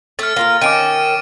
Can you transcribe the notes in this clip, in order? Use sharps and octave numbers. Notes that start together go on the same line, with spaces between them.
A3 A4 F6 A6
A#3 F4 A#4
D#3 C#4 D6 D7 D#7